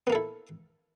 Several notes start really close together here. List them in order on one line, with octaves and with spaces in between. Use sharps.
B3 A#3 A4 E4